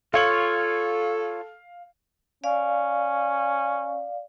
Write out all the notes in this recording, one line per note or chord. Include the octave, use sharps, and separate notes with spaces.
F4 A4 C#5 F5 C#7 F#7
C#4 D5 F5